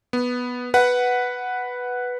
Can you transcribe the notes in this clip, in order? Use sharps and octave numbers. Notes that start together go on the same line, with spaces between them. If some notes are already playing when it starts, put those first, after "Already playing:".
B3
B4 F#5